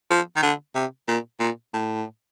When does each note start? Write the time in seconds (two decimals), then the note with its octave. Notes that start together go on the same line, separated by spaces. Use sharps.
0.10 F3
0.36 D#3
0.43 D3
0.75 C3
1.08 A#2
1.40 A#2
1.74 A2